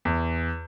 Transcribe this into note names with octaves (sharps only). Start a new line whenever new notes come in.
E2